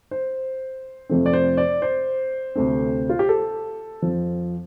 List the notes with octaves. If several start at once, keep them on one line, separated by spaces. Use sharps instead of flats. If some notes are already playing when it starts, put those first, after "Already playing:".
C5
F2 C3 F3 A3 C4
D5
C5
D5
C5
D2 C3 A3 C4
F4
G4
A4
F2 F3 C4